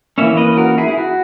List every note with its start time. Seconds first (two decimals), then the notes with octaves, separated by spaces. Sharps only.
0.18 E3 A#3 C#4 C#5 E5
0.37 B4 D#5
0.57 F#4 A#4
0.78 E4 G#4
0.88 E4
0.98 F#4